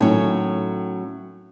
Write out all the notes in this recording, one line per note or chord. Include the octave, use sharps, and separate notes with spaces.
A2 D#3 F#3 C#4